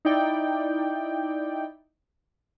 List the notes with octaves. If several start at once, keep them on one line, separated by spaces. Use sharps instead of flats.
D#4 E4 D5 G5